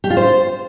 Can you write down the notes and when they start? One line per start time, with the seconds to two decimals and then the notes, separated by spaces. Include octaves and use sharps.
0.04 G4
0.10 F4
0.17 C5